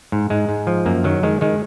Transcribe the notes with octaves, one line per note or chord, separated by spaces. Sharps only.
G#2
G#2 G#3
G#2
F3
F#2 A#3
D#3 F#3
D#3 G#3
D#3 G#3